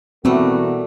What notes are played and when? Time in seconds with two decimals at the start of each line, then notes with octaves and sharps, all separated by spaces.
0.25 B2 E3 G3 A3 A#3 C4 F#4